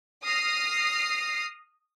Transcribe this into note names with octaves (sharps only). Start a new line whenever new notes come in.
D#6 F6 A#6 C7